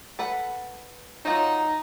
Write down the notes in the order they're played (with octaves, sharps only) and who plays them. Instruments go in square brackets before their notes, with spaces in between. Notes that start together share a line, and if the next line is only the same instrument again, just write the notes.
[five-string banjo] A4 B4 F#5
[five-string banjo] F#3 F4 [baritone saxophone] D#4